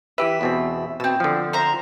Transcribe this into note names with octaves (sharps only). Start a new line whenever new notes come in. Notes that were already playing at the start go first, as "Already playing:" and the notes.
E3 G4 B4 E5
E2 B2 C4
B2 C4 E6
D3 F3
C5 E5 A#5